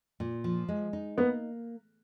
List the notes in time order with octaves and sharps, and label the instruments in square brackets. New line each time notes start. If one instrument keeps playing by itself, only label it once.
[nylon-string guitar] A#2
F3
G#3
D#4
[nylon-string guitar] A#3 [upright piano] B3